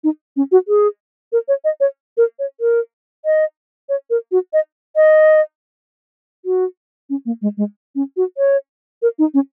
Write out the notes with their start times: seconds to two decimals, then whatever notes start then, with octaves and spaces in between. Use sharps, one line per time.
0.04 D#4
0.36 C#4
0.52 F#4
0.68 G#4
1.32 A#4
1.48 C#5
1.64 D#5
1.80 C#5
2.17 A#4
2.39 C#5
2.61 A#4
3.25 D#5
3.89 C#5
4.10 A#4
4.32 F#4
4.53 D#5
4.96 D#5
6.45 F#4
7.10 C#4
7.26 A#3
7.42 G#3
7.57 G#3
7.95 C#4
8.17 F#4
8.38 C#5
9.02 A#4
9.19 D#4
9.34 C#4